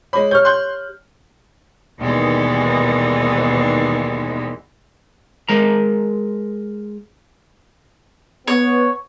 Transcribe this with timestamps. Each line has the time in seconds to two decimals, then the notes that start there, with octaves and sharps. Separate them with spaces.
0.13 G#3 C#5 B5 D6
0.31 G4 C#5 F6 G6
0.45 C6 F#6 G6
2.00 D#2 B2 D#3 E3 G3 G#3
5.49 G#3 A#4 A#5
8.48 B3 C#5